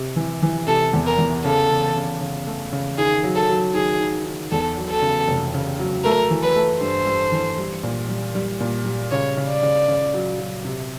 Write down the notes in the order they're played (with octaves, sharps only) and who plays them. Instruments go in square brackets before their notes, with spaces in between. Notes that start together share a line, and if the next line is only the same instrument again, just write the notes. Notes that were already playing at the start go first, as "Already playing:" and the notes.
Already playing: [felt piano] C3
E3
E3
[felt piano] C3 [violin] A4
[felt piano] E2
[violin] A#4
[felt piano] E2
[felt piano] C#3 [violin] A4
[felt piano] C#3
C#3
C#3
A3
C#3
[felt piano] D#3 [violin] G#4
[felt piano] F#3
[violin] A4
[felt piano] F#3
[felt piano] D#3 [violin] G#4
[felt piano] D#3
D#3
[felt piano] E2 [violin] A4
[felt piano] F#3
[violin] A4
[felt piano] C#3
F1
C#3
F#3
[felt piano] A3 [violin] A#4
[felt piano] E3
[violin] B4
[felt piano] A3
[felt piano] G2 [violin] C5
[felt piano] G2
E3
G3
A#2
G3
G3
A#2
G3
[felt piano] C#3 [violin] C#5
[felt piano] C#3
[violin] D5
[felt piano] C#3
C#3
F#3
F#3
C3